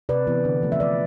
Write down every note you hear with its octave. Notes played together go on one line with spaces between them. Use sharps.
C3 B4 D5
E3 B3
D3
F3 A3
E5
D3 B4 D5